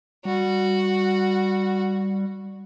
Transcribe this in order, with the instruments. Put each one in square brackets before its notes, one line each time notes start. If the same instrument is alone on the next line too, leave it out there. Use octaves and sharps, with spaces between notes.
[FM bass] G3 [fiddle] F#4